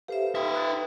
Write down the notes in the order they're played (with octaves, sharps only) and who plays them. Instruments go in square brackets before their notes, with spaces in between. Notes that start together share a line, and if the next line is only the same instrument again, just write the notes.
[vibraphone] G4 C5 E5 [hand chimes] A4 B4 F5
[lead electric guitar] D#4 E5 [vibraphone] B4 [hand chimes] G5 C6 D#6
[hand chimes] D#6 F#6 A6